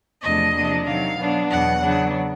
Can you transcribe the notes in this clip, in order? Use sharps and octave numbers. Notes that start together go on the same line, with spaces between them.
E2 C3 F3 A3 D4 D#5
C3 F3 A#3 D4
C3 D#3 F#3 F5
B2 F#3 B3 D4
E2 B2 F#3 F#5
C#3 F#3 B3 D4